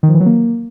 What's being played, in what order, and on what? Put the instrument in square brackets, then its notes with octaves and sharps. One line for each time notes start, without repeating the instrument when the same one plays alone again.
[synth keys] D#3
F3
E3
F#3
A#3